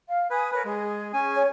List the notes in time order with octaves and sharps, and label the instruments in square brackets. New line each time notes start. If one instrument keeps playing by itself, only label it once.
[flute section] F5
[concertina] B4 [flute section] G#5 D#6 G#6
[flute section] A#4 C#5 [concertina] B4
[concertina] G#3 [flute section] G#4
[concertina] C#4 G#5
[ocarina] C#5